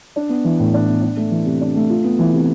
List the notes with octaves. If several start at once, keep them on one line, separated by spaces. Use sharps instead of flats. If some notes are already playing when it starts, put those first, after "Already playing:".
D4
B3
E3
A2
D4
B3
D4
A3
E3
C3
D4
A3
F4
B3
E3
C3